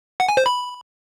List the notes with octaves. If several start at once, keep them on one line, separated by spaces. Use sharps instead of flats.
F#5
G#5
C5
B5